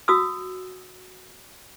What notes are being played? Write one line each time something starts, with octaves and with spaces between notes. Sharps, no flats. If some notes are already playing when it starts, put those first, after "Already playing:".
F#4 D#6 E6